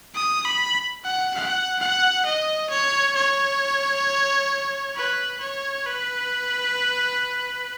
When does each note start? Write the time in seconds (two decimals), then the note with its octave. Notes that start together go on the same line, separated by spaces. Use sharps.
0.15 D#6
0.45 B5
1.04 F#5
1.34 F#5
1.80 F#5
2.25 D#5
2.70 C#5
3.15 C#5
4.96 B4
5.40 C#5
5.86 B4